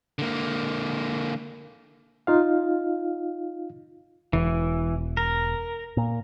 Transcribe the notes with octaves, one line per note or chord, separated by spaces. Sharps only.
D3 A#3
D#4 F4 F5
E1 E3
A#4
A#2